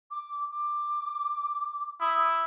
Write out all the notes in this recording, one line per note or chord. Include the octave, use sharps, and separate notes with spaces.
D6
D6
E4 D#6